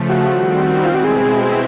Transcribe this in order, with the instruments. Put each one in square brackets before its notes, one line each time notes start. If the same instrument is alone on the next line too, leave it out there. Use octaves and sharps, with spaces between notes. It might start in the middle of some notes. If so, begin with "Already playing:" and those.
Already playing: [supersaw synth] C#3 F3 A3
[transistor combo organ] F#4
[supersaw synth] D#3 G3 C4
[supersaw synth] B2 G#3 C4 E4 [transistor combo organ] F4
[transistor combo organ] F#4
G#4
G#4